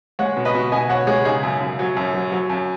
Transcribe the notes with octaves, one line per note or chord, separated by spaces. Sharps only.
G#3 C#5 F#5
B2
B4 D#5
B2
B2 D#5 G#5
B2 C#5 F#5
G#3 G#4 C#5
C#3 D#4 G#4
F#2
F#2
F#3
F#2
F#3
F#3
F#2